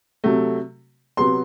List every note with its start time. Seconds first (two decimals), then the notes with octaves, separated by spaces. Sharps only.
0.24 C3 F#3 A3
1.17 C3 F#3 B3 C6